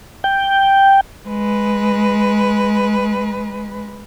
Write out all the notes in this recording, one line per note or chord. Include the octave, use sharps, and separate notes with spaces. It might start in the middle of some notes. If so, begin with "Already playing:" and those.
G5
G#3 B4